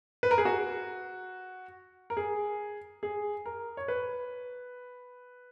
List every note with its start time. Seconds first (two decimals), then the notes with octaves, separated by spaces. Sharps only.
0.23 B4
0.31 A#4
0.38 G#4
0.45 F#4
2.10 A#4
2.17 G#4
3.03 G#4
3.46 A#4
3.77 C#5
3.88 B4